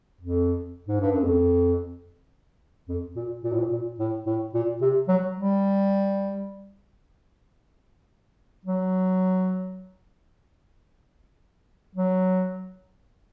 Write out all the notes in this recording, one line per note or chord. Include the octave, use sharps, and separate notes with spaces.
F2
G#2
G2
F#2
F2
F2
A#2
A#2
A2
A#2
A#2
A2
A2
A#2
C3
F#3
G3
F#3
F#3